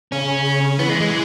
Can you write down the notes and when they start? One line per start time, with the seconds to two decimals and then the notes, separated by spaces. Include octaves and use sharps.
0.12 C#3 C#4
0.45 C#3
0.79 E3 B3
0.89 G#3
1.00 G#3